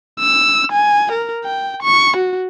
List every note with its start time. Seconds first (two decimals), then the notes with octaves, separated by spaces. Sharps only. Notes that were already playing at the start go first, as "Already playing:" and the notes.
0.20 E6
0.72 G#5
1.12 A#4
1.45 G5
1.83 C#6
2.17 F#4